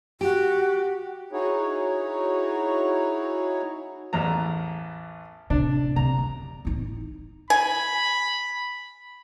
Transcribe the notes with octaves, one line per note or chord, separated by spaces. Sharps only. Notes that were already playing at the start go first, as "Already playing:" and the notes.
F#4 G4
D#4 E4 F#4 G#4 C#5
A1 E2 A#5
A2 C3 D4
C3 A#5
F#2
A1 D#4
G#5 B5